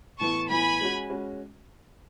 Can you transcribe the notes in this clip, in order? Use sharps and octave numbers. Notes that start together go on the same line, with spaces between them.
A2 E3 B3 E4 A5 C#6
A2 E3 B3 E4 G#5 B5
G#3 C#4 F#4
G#3 C#4 F#4